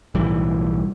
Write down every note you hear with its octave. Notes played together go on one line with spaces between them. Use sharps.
B1 A2 E3 G3